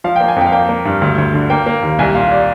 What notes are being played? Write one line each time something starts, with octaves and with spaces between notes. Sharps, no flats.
F3 F5
G5
A#3
G#5
F2 G5
F5
A#3 G5
A#3
G2
D2
D2
D3
A#3 G5
A#3
D#2
C2 G#5
A#2 F5
D5